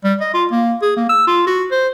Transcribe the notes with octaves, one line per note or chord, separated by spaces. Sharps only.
G3
D#5
F4
A#3
G#4
A#3
E6
F4
F#4
C5